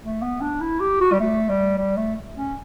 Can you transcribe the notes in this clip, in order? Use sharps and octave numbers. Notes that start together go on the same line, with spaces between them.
A3
B3
D4
E4
G4
F#4
G3
A3
G3
G3
A3
C#4